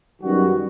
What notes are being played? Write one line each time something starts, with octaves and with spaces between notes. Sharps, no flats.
F#2 D#3 G3 B3 D#4 F#4